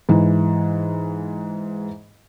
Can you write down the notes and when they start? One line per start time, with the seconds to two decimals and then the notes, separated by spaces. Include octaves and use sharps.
0.09 G#2 E3